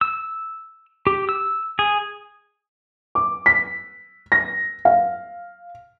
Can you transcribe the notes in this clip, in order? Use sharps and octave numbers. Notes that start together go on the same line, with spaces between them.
E6
G4
E6
G#4
D6
B6
A#6
F5